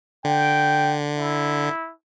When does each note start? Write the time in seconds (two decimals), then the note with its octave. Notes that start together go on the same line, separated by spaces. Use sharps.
0.24 D3 G5
1.17 E4